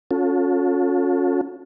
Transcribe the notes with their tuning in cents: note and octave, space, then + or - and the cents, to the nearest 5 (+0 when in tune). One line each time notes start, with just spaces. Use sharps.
C#4 +0 F4 +45 A4 +0